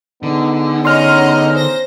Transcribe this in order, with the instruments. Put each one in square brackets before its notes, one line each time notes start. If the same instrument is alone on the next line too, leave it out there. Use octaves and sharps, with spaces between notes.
[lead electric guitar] D3 [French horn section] B3 D#4 G#4
[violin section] C#4 D#5 A#5 [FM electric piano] C6 F6
[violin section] C5 A#6